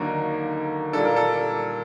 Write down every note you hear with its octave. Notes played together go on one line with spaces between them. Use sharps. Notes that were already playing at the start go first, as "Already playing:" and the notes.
Already playing: D#2 D3 F#3 A#3 D#4 A#4
A#2 G3 A#3 D4 A4
A#4
A4